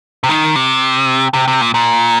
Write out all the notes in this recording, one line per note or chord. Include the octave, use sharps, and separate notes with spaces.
C3
D#3
C3
C3
C3
A#2
A#2